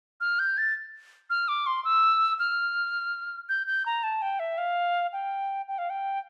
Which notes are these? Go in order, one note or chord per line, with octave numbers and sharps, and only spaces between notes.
F6
G6
A6
F6
D6
C6
E6
F6
G6
G6
A#5
A5
G5
E5
F5
G5
G5
F5
G5